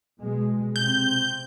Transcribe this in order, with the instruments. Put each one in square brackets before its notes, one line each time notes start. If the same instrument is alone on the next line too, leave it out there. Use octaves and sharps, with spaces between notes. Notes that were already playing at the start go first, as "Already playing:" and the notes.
[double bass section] B2 G#3
[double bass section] C3 C4 [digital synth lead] G6